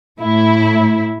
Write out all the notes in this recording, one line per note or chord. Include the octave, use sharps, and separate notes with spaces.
A2 E4